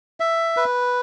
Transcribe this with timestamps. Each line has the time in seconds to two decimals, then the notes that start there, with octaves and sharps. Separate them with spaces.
0.20 E5
0.57 B4